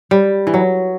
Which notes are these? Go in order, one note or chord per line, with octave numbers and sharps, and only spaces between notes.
G3
E3
F#3